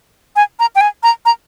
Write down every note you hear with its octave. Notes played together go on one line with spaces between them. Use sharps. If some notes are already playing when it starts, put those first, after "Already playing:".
G#5
A#5
G5
G#5
A#5
A#5